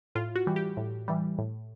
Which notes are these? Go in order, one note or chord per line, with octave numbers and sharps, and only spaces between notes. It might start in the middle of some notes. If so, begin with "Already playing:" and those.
A2 F4
F#4
E3 G3
G4
A2
E3 G3
A2